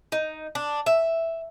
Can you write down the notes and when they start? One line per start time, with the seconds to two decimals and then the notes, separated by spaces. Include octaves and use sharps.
0.12 D#4
0.55 D4
0.86 E5